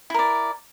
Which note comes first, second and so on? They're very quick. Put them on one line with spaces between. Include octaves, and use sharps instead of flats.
E4 A#4 D5